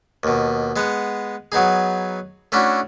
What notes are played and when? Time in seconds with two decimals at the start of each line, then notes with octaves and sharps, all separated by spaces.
0.23 D#2 B2
0.76 G#3 B3 F#5
1.52 F#3 B3 D#4 G#4
2.52 A3 C#4 D4 E4 F#4